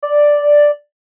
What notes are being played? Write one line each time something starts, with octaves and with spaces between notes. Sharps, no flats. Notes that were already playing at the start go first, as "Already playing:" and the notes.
D5